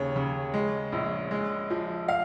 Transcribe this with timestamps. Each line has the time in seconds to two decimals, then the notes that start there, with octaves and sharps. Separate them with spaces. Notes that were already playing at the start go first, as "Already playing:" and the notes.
Already playing: D#2 C#3 C#5
0.16 C#3
0.54 G#3
0.92 A#1
1.31 G#3
1.70 F3
2.08 F5